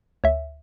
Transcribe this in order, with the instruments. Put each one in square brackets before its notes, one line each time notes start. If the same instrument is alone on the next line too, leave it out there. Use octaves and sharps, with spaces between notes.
[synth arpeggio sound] D2 C#5 E5